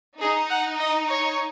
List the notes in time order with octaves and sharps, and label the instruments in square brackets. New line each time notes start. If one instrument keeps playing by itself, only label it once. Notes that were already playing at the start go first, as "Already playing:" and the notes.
[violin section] D#4 [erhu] G#4
[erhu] F#5
D#5
C#5